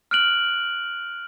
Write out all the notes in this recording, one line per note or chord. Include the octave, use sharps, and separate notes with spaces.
F6 F#6 D7 F#7